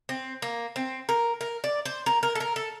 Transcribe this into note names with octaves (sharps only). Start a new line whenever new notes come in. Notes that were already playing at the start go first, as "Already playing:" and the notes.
C4
A#3
C4
A#4
A#4
D5
C5
A#4
A#4
A4
A#4
A4